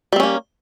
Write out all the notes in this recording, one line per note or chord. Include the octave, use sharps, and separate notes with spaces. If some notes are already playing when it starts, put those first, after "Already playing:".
G3 A#3 C4 C#4